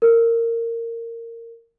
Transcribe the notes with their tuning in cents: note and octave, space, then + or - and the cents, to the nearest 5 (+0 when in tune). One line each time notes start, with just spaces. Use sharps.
A#4 -20